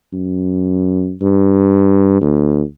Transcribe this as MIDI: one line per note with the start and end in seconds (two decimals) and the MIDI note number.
0.13 1.14 42
1.21 2.18 43
2.21 2.62 38